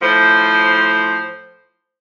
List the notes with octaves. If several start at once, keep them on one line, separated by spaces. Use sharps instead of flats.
A2 F3 C5